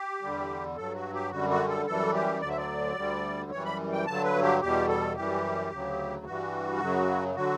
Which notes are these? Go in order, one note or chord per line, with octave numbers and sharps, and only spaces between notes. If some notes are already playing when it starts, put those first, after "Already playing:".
Already playing: G4
E2 D3 G3
G2 F#3 A4
F#4
G4
F#2 D3 G3 F#4
F#4
A4
F#2 E3 G3 A4
G4
D2 D3 F#3 D5
E5
D5
D2 D3 G3
F#2 E3 G3 C#5
B5
G5
G2 D3 F#3 A5
B4
G4
E2 B2 G3 G4
A4
F#2 E3 G3 G4
D2 C#3 F#3
G2 E3 G3 F#4
F#2 C#3 F#3
D3 F#3 F#4